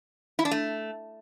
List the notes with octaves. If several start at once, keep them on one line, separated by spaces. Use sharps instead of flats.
E4
D4
A3